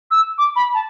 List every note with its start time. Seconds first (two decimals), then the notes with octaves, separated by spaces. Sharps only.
0.11 E6
0.38 D6
0.56 B5
0.74 A5